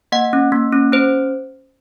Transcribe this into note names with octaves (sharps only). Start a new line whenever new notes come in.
A#3 D#5 F#5
C#4
A#3
C#4
C#4 C5